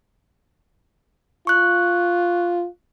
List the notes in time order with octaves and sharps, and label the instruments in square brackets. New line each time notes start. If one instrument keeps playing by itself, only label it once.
[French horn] F4 [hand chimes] C#6 F#6